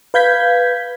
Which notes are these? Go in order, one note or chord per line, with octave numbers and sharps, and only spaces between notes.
B4 F5 G6 G#6 B6